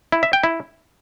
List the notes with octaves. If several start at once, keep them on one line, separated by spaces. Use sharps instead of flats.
E4
E5
G5
E4